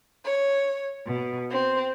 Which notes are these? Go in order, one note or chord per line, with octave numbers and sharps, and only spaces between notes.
C#5
B2
C4